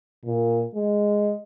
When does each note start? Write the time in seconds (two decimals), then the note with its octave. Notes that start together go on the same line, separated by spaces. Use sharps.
0.25 A#2
0.75 G#3